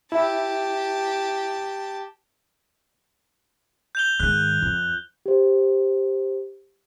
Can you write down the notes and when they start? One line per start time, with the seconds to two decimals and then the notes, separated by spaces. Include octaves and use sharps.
0.12 E4 G4 A5
3.95 G6 F7 G7
4.20 G#2 D#3 F#6
4.62 F2
5.26 G4 C5